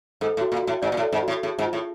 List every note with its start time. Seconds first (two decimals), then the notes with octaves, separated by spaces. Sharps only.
0.21 G#2 A4
0.37 A2
0.41 F#4
0.52 A#2
0.62 A2 F#4
0.82 G#2 D5
0.92 A#2
0.97 A2
1.02 A4
1.12 G#2
1.23 A2 F#4
1.43 A2 G#4
1.58 G#2
1.64 F4
1.73 A2